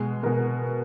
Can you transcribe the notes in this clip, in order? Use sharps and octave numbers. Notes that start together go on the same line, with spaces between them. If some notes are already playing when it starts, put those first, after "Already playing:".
Already playing: B2 G#3
B2 G#3 A#4